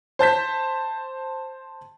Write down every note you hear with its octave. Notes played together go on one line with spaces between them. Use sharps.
C5 A5 G6 B6